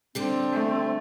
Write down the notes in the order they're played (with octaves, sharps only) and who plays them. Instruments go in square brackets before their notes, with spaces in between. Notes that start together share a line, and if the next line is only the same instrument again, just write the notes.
[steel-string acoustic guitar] D3 G3 D4 [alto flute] C4
[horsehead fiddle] A3